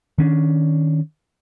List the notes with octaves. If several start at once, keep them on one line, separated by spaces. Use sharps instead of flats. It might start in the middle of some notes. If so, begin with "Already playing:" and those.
D#3 C#4 D4